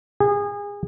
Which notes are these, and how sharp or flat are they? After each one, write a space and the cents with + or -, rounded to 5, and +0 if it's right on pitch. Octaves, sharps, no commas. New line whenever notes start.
G#4 -30